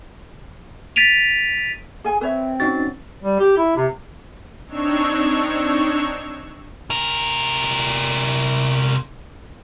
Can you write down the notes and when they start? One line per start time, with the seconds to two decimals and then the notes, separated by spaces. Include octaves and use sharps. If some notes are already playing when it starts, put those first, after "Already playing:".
0.96 A6 B6 D7 D#7 F7
2.04 G#4 G#5
2.21 C4 B4 C#5 E5
2.60 C#4 D#4 F#4 A6
3.23 G3
3.39 G4
3.57 E4
3.77 C3
4.67 C4 D4 D#4 C#5 C#6 E6
6.90 C3 A#4